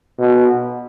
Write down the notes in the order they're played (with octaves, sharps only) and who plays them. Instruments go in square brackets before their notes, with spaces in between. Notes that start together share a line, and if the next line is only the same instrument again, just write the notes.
[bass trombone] B2